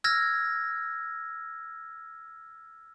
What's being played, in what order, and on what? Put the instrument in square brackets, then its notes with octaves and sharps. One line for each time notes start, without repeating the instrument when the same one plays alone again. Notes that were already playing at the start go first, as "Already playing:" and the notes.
[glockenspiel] E6 F6 G#6 A#6